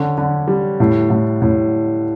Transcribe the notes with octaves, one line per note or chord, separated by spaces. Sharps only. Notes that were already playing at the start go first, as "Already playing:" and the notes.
Already playing: D3 C#4
D3
G3
A2
A2
A2